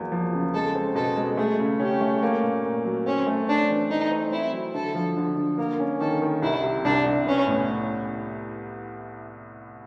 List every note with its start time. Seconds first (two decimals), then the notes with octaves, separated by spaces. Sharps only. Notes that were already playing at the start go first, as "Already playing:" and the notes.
Already playing: E2 F#3 A#3
0.12 F3
0.33 C#3
0.54 G#3 A4
0.75 C4
0.95 B2 A4
1.16 G#3
1.37 A3 G#4
1.59 C#3
1.80 C#4 G4
2.01 A3
2.23 A#3
2.43 A#2
2.64 A#2
2.85 F#3
3.06 C4 C#4
3.27 A3
3.48 C4 D4
3.69 E3
3.90 A3 D#4
4.11 C4
4.32 C4 E4
4.53 F#3
4.74 D3 A4
4.95 F3
5.17 D3
5.37 D3
5.58 A#3 A#4
5.80 C#4
6.00 D#3 A4
6.22 D#3
6.42 C2 E4
6.63 C3
6.84 C2 D4
7.06 C2
7.26 B3 C#4
7.47 A2